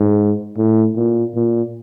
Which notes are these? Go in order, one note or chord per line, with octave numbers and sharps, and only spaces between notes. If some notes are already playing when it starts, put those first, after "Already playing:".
Already playing: G#2
A2
A#2
A#2